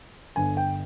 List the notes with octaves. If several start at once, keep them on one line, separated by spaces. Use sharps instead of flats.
G1 G2 D3 G#5
G5